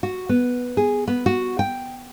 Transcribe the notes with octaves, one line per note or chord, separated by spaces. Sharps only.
F#4
B3
G#4
B3
F#4
G5